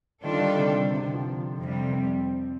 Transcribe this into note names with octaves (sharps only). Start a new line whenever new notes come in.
D#3 G3 D4 F4 A4
D3
D#3
C3
C3
D3
F3
F2 C3 G3
C4